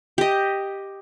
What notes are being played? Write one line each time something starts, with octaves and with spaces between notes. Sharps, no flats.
G4 D#5